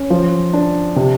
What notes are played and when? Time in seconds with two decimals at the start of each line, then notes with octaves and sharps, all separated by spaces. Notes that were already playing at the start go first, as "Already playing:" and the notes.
Already playing: C#4
0.10 F3
0.53 D4
0.96 C3